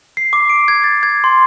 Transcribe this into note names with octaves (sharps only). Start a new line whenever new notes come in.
C7
D6
D7
G#6
A6
G#6
C6